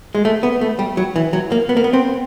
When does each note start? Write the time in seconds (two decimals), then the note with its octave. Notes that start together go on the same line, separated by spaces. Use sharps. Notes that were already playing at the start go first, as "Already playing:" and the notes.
0.15 G#3
0.25 A3
0.43 B3
0.61 A3
0.79 G3
0.97 F#3
1.16 E3
1.33 F#3
1.52 A#3
1.69 B3
1.77 A#3
1.84 B3
1.93 C4